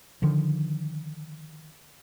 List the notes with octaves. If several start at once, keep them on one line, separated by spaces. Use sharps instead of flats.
D3 D#3 F3